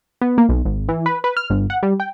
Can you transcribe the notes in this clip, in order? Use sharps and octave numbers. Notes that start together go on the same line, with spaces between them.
B3
A#3
B1
G#1
E3
B4
B4
F6
G1
F#5
G3
G5